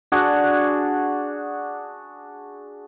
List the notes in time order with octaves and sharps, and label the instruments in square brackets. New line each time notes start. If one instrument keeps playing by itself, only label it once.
[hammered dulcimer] D4 F#4 G#4